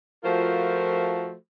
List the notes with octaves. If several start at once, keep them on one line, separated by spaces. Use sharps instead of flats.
F3 A3 F4 F#4 A#4 C5